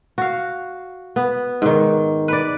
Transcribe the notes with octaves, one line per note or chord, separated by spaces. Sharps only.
F#4 F5
B3
G#2 D#3
B4 D5